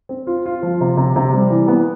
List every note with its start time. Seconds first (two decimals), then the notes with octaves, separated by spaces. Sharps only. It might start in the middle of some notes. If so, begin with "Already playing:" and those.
0.09 C4
0.27 F4
0.46 F4
0.63 F3
0.81 C3
0.97 C3
1.16 C3
1.33 G3
1.50 E3
1.68 B3